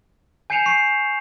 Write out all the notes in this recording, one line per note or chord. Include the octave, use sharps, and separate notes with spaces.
G#5 G6 C7 C#7 E7 F7
C#6 C7